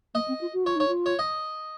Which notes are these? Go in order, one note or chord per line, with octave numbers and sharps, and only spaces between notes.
A#3 D#5
C4
F4
F#4
F4 C#5
D#4 C#5
F4
C#5
D#5